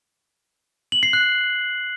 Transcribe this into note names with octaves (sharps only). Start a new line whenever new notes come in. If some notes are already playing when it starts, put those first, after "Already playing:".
F#7
C7
F#6